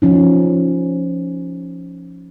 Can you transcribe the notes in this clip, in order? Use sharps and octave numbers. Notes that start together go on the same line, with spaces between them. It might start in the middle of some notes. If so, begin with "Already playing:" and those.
F3 C#4 D#4